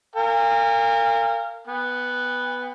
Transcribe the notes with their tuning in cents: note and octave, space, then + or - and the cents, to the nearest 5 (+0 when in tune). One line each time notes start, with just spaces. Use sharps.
A#4 -30 F5 -15 G#5 -45
B3 +0 G5 +45